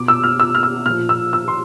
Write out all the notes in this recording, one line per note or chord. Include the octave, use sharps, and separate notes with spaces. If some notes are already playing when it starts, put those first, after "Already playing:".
Already playing: B2 D6
E6
F6
E6
F6
E6
A#2 F3 F6
E6
E6
C6